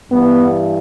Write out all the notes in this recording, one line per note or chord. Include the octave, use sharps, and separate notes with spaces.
G2 E3 B3